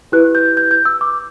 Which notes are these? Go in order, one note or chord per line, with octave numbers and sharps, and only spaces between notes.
E4 G4 B4 F#6
G6
G6
G6
E6
D6